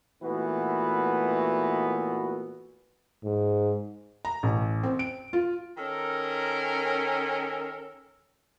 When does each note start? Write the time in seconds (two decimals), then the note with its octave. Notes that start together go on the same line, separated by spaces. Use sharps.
0.23 A#2 E3 A3 B3 F#4 B4
3.24 G#2
4.25 A#5
4.43 A1
4.83 C4
4.99 D7
5.33 F4
5.77 D#3 C#4 A4 A#4